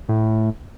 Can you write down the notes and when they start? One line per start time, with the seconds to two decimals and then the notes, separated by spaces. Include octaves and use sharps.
0.09 A2